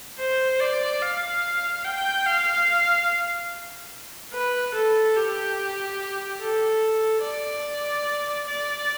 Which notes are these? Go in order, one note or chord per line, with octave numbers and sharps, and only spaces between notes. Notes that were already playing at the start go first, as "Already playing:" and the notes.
C5
D5
F5
G5
F5
B4
A4
G4
A4
D5
D5